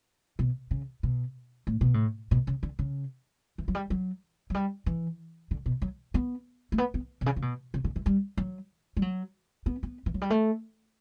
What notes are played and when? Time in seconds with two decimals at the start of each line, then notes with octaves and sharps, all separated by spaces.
0.39 B2
0.71 C#3
1.03 B2
1.67 A2
1.81 B2
1.94 A2
2.31 B2
2.47 C#3
2.63 D3
2.79 C#3
3.58 E3
3.68 F#3
3.75 G3
3.90 F#3
4.50 F#3
4.54 G3
4.86 E3
5.51 D3
5.66 B2
5.82 F#3
6.14 B3
6.72 A3
6.78 B3
6.94 B3
7.21 B2
7.26 C#3
7.36 C#3
7.42 B2
7.74 C#3
7.84 D3
7.96 E3
8.06 G3
8.37 F#3
8.97 G3
9.02 F#3
9.66 B3
9.83 B3
10.06 E3
10.14 F#3
10.21 G3
10.30 A3